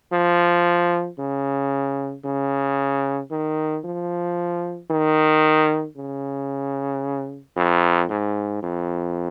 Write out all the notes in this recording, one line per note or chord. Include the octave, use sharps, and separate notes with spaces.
F3
C#3
C#3
D#3
F3
D#3
C#3
F2
G#2
F2